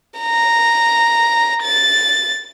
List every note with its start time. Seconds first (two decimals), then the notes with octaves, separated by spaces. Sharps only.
0.19 A#5
1.63 A6